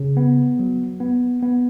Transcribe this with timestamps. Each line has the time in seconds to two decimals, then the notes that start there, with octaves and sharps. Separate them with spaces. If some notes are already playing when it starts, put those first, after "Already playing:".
Already playing: C#3
0.17 B3
0.59 F#3
1.00 B3
1.43 B3